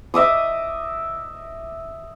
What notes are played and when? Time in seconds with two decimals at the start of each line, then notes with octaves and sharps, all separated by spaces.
0.14 D#5 E5 D6 D#6